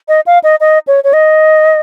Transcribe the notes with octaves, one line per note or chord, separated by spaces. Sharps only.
D#5
F5
D#5
D#5
C#5
C#5
D#5